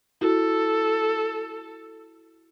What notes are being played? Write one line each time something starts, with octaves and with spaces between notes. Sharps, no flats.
E4 F#4 A4